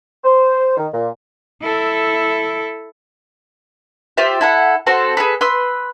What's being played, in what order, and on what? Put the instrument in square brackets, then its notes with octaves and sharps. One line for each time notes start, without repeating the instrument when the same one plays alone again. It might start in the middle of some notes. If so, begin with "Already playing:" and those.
[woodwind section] C5
D#3
A#2
[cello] E4 A4
[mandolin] F4 G4 C5 E5
E4 A4 F#5
C4 F#4 A4 C5
G#4 A4 B4
B4 C6 E6